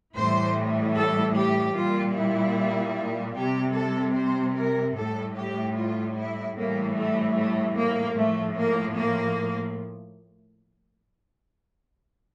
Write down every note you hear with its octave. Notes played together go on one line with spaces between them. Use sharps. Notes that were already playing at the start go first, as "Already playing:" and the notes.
A2 E3 G3 C5
A4
G4
A#2 G3 F4
E4
C3 G3 G4
A4
C5
A#4
A2 G3 A4
G4
F4
E4
A2 E3 G3 A#3
A3
A3
A#3
A2 F3 A3
A#3
A#3